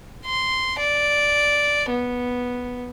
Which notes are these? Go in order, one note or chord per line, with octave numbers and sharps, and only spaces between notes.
C6
D5
B3